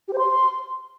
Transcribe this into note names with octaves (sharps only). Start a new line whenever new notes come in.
G4
C5
C6